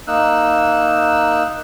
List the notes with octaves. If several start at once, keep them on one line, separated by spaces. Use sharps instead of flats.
A#3 D#4 E6 F#6